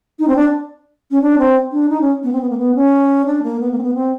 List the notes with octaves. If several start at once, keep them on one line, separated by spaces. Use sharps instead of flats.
D#4
C4
D4
C#4
D4
C4
D4
D#4
C#4
B3
C4
B3
A#3
B3
C#4
D4
A#3
B3
A#3
C4
B3
C4